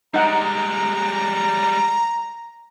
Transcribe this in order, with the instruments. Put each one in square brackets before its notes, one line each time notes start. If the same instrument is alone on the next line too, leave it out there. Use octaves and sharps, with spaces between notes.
[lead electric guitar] G3 G#3 [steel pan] D#4 F#5 [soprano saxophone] A#5